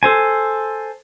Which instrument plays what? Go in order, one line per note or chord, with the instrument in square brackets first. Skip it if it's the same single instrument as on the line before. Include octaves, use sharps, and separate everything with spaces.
[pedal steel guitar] A4 C5 G#5